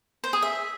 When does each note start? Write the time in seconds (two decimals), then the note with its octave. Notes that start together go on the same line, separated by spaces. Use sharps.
0.24 C5
0.33 G#4
0.42 E5